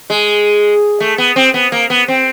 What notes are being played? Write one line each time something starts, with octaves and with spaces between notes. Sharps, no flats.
G#3
A3
B3
C4
B3
A#3
B3
C4